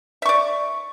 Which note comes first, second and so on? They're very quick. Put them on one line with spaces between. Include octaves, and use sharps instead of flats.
E5 C#6 D5